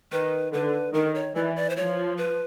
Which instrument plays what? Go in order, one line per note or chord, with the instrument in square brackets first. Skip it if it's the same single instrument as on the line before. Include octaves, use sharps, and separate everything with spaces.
[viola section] D#3 [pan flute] B4
[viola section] D3 [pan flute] B4
[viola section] D#3 [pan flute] A#4
[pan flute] C#5
[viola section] E3 [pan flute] D5
[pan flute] D5
C5
[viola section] F3 [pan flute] C#5
[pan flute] B4